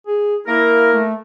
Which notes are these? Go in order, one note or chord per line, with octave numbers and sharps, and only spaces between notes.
G#4
A#3 E4 A#4
A3